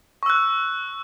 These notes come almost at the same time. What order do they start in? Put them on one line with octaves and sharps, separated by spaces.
C#6 E6 F#6